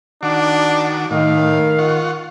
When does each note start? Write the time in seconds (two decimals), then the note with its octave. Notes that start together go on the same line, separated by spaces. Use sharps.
0.23 D#3 D4 F#4 D6
1.11 A2 D#3 F5
1.79 F4 F#5 C#6